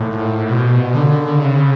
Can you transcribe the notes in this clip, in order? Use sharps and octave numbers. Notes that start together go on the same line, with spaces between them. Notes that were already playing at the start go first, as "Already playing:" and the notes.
Already playing: A2
B2
D3
C#3